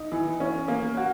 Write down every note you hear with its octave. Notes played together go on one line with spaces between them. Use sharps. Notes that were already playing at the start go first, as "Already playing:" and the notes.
Already playing: D#4
E3
C#4
A#3
F#4